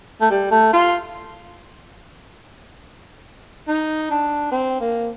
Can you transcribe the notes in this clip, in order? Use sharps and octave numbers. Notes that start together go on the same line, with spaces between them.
A3
G3
A3
F4
D#4
D4
C4
A#3